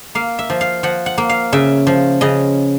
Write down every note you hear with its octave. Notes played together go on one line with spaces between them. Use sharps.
A#3 F5
E5
F3
F5
F3 F#5
F#5
A#3
F5
C#3 E5
F3
C#3 D#5